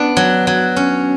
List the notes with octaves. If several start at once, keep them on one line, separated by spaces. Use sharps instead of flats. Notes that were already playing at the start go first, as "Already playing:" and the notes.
Already playing: B3 D4
F#3
F#3
C#4